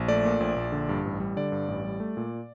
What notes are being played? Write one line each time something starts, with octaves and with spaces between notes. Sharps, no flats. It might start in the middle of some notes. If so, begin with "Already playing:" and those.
Already playing: A#1
A3 D5
A#2
A#1
A#1
D3
G2
A1
G3
D3 D5
G2
A1
G3
A3
A#2